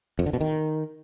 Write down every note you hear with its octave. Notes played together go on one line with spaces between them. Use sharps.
F2
D3
B2
D#3